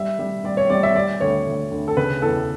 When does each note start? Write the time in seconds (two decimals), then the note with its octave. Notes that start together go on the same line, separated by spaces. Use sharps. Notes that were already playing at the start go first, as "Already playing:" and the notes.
Already playing: G3 E5
0.19 G3
0.44 G3 D5
0.57 C#5
0.70 G3 D5
0.83 E5
0.95 G3 D5
1.21 D2 C#5
1.47 D2
1.71 D2
1.88 A4
1.97 C#3 B4
2.22 E2 A4